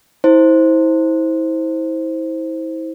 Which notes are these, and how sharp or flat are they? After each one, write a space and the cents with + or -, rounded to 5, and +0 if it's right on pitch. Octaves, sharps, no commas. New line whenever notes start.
E4 -35 C5 +0